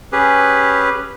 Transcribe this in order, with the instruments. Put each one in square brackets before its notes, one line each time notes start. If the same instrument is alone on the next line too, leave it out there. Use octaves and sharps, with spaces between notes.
[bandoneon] C#4 G4 G#4 B4